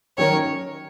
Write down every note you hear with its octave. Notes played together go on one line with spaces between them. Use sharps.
D#3 F#3 C#4 A#4 C#5